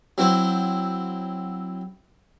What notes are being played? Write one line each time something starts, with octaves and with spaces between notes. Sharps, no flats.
F#3 C4 E4 C5 C6